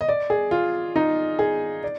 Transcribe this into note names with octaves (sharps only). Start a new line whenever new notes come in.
D#5
D5
G#4
F4
D#4
G#4
D5